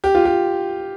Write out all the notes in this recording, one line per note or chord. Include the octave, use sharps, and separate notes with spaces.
G4
F4
G4